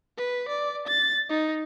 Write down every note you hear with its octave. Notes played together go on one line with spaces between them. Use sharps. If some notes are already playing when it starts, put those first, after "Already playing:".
B4
D5
A6
D#4